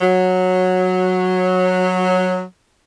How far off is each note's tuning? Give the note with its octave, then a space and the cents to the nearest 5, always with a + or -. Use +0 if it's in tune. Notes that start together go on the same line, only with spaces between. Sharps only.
F#3 -10